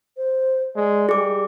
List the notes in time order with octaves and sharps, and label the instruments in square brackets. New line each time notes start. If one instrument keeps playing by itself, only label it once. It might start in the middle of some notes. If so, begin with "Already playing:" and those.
[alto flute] C5
[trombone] G#3 [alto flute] D5
[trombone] G3 [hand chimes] G#4 D6